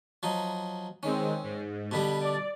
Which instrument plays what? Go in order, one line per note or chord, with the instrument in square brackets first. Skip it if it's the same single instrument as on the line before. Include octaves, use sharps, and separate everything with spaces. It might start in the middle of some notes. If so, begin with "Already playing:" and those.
[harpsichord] F3 F#3 D#4
[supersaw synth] D#3 G#3 C4 [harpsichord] C#4
[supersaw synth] G#2
[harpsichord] B2 D3 G3 [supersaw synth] B5
[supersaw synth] D5